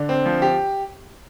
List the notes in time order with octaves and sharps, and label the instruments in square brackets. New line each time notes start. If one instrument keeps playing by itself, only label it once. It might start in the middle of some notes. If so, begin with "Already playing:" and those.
Already playing: [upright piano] D3 D4
[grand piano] C4
F3
G4